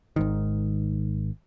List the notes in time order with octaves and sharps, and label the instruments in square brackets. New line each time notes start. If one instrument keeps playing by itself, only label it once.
[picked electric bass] G#1 G#2 D#3